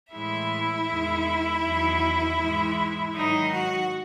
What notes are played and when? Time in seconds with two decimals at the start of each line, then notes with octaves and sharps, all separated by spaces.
0.13 A2 E3 G#3 E4 E5
0.88 E2 D#3 G#3
1.64 E2 D#3 F#3
2.39 G#2 E3 G#3
3.15 G#2 D#3 F#3 D#4 D#5
3.53 F#4 F#5